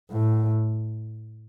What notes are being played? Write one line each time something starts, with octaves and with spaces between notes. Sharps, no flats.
A2